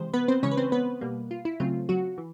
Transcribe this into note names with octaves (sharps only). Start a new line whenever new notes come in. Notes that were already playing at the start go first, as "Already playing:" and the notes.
Already playing: C3 E3 G#3 C5
B3 B4
C4 C5
C#3 E3 G#3 C#4 C#5
B4
C4 C5
B3 B4
B2 G3 A#3
F4
E4
C#3 F#3 A3 C4 F4
F#3 F#4
E3